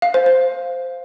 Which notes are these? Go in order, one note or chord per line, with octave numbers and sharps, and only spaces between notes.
F5
C5
C5